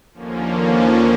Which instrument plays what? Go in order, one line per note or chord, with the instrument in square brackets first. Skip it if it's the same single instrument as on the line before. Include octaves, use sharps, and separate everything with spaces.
[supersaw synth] D#2 D3 F3 A#3 C#4